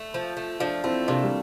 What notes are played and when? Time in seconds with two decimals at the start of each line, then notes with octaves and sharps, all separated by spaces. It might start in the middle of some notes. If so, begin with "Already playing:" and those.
Already playing: A3
0.14 F3
0.37 A3
0.60 F3 D4 F4
0.84 A3 C4 E4
1.08 C3 A#3 D4
1.23 G3